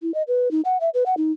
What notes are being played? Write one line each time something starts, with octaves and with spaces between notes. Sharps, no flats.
E4
D#5
B4
D#4
F#5
E5
B4
F#5
D#4